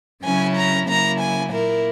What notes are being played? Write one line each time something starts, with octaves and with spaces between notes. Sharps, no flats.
C#3 F#3 C#4 E4 G#5
A#5
C#3 F#3 A#3 E4 A#5
G#5
A#2 A#3 E4 A#4